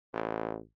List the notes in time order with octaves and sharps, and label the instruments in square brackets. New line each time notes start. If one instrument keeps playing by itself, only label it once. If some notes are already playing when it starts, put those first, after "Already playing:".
[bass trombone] A1